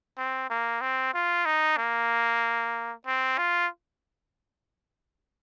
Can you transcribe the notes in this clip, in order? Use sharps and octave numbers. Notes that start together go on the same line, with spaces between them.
C4
A#3
C4
F4
D#4
A#3
C4
F4